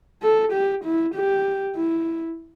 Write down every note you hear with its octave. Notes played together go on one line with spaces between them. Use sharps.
A4
G4
E4
G4
E4